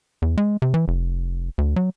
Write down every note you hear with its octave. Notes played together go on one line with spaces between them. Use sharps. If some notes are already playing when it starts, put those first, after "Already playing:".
E2
G#3
C3
E3
F1
D2
F#3